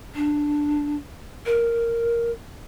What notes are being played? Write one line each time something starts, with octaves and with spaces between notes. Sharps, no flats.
D4
A#4